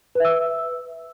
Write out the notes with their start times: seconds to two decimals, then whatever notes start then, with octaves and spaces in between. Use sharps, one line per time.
0.15 B4
0.20 E5
0.25 E6